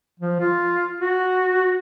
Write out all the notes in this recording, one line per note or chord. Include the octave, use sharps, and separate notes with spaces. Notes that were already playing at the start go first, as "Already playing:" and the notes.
F3
F4
F#4